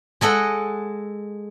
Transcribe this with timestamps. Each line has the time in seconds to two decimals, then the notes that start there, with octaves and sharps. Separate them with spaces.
0.21 G#3 A4 D#5 F#5